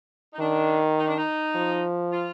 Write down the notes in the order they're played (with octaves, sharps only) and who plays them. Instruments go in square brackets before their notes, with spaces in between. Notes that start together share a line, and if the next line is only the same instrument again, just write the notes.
[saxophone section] D#4
[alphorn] D#3 [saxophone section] D4
[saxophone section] D#4
D4
D#4
[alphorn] F3
[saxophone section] F4